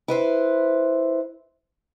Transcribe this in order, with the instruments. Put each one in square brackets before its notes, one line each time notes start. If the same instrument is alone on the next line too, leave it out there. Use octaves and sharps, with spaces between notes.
[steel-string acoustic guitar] E4 B4 C5